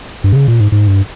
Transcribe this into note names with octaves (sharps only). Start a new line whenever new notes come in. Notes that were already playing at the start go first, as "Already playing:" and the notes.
G2
C3
C#3
A#2
G#2
G#2
G2